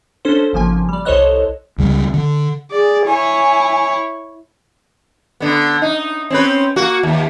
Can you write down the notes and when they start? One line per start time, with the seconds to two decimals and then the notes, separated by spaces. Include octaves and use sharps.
0.25 C#4 D4 A4 C5
0.53 G#1 C#3 F3 A#3 G#5
0.89 G3 D5
1.05 C2 A4 C5 C#5 D#5 F#6
1.78 C#2 C#3 G3
2.14 D3
2.71 G#4 D5
3.06 E4 C#5 G#5
5.40 D3 B3
5.82 D#4
6.30 C4 C#4 B4
6.76 A#3 F#4
7.03 D#2